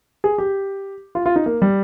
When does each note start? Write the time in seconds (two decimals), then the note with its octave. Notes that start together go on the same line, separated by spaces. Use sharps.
0.24 G#4
0.38 G4
1.15 F4
1.26 F4
1.36 D#4
1.46 A#3
1.62 G3